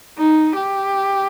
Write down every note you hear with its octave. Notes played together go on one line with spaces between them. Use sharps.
D#4
G4